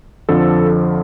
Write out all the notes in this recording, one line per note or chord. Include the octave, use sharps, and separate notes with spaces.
F2 D3 F3 A4